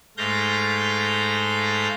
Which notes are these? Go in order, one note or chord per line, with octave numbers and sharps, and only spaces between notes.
G#2 A3 F5 G6 A#6